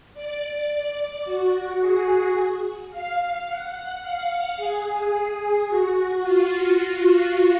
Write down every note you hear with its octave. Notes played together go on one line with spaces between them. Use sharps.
D5
F#4
G#4
F5
F#5
F5
G#4
F#4
F4